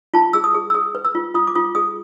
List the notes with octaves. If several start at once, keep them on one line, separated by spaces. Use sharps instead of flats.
F4 A5
G#4 E6
D#6
G#4
E6
G#4 D#6
B4
E6
F4
F4 D#6
D6
F4 D#6
G#4 D#6